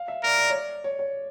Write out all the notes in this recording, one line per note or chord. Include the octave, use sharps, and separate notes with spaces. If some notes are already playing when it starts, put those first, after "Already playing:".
Already playing: F5
E5
A#4 D5
D5
C#5
D5
C#5
C#5